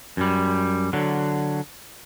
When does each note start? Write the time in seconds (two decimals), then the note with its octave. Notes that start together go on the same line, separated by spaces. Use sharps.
0.17 F#2 G3
0.93 D3 F#3